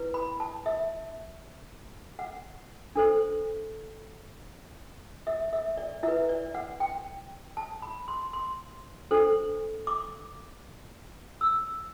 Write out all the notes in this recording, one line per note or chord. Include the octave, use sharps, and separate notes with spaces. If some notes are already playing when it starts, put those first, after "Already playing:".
Already playing: E4 B4
B5
A5
E5
F#5
D4 A4 C5
E5
E5
D5
E4 E5
B4
D5
F#5
G5
A5
B5
C6
C6
D4 A4 C5
D6
E6